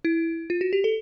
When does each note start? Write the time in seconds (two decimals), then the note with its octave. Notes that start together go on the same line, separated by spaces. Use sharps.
0.05 E4
0.50 F4
0.61 F#4
0.73 G4
0.84 A4